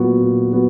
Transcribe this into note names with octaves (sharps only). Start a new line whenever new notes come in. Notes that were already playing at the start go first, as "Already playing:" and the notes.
Already playing: A#2 F#3 B3 F#4
A#2
F#3 B3 F#4